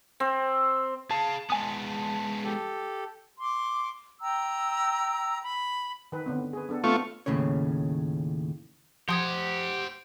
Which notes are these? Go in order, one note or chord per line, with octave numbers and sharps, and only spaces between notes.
C4
G#4 F5 A5
G#3 B3 G#5 D#6
G4 A4
C6 D6
G5 A#5 E6
B5
D#3 B4
D3 B3 C4
G#4 B4
B3 D4 A4
A3 B3 C4 F4 C#6
D#2 A2 C#3 C#4 C#5
F3 G4 C5 F#5 C6 D#6 G#6